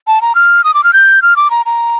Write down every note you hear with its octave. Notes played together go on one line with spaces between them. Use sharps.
A5
A#5
F6
D#6
D6
F6
G6
F6
D6
A#5
A#5